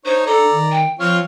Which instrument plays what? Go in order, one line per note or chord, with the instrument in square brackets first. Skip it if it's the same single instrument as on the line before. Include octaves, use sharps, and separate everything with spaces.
[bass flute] D4 [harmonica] D#4 C#5 [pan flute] C5
[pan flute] A4 [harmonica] D5 A#5
[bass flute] D#3
[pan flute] G5
[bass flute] F3 [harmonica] C4 F4 C#5 [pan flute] F6